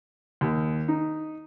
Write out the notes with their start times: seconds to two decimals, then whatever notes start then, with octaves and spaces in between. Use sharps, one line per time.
0.41 D#2
0.88 D#4